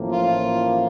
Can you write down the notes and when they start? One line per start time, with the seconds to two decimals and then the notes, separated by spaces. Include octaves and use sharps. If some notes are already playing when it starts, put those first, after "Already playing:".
Already playing: A1 A2 F3 A#3
0.12 F4